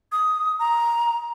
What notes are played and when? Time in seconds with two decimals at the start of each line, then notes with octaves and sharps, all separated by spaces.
0.12 D#6
0.59 A#5